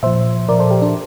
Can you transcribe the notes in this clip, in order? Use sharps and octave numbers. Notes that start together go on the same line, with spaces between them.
A#2 F3 C5 E5
A#2 F3 A#4 D5
A4 C5
G4 A#4
D4